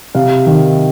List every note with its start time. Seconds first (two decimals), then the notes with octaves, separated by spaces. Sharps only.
0.15 C3 F5
0.46 D#3